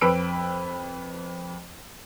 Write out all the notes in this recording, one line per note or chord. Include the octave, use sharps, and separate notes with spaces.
F2 B4 B5 E6 D7